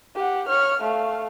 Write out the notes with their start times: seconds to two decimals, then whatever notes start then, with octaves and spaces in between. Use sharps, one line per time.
0.16 G4 F#5
0.48 C#5 F6
0.82 A3 F5